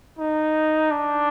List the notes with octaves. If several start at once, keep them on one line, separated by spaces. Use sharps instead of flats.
D#4
D4